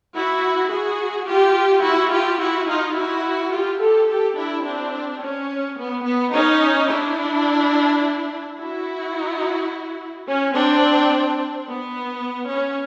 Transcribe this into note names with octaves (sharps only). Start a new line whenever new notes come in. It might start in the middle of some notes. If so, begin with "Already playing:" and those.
E4 F#4
F#4 G#4
F4 G4
E4 F#4
F4 G4
E4 F#4
D#4 F4
E4 F#4
F4 G4
G4 A4
G4 A4
D4 E4
C4 D4
C#4
B3
B3
C#4 D#4
D4 E4
E4 F#4
C#4
C4 D4
B3
C#4